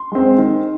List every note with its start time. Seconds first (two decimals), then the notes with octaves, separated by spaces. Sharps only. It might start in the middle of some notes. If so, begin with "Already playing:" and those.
Already playing: C6
0.12 G#3 C4
0.38 D#3